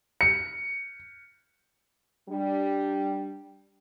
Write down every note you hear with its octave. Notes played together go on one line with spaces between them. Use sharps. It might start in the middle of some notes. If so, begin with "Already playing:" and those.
C#7
G3 D4